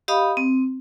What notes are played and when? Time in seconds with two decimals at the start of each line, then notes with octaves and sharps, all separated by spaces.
0.08 G4 D#5 F5 B5 D#6
0.37 C4